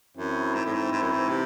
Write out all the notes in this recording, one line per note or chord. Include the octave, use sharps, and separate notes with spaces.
F#2 E3 C4 E4
G#2
A2
G#2
G#2
F#2
G#2
C3